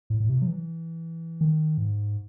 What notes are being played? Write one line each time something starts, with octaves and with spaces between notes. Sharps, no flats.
A2
A2
C3
F#3
E3
D#3
G#2